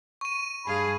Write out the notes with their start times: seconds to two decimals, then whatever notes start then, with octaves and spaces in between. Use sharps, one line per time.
0.21 C#6 D#7
0.65 G2 G#4 F5 G#5 A5 B5